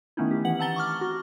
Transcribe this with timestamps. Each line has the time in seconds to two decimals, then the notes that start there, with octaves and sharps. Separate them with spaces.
0.17 D#3 A3 B3 C#4 D#4 E4
0.31 G4
0.44 E3 F#5 F#7
0.59 C4 F#5 A5 A#5 A6 G7
0.76 C#6 D6 F6
1.01 F#4